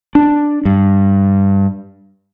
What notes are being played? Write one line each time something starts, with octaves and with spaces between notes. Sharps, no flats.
D4
G2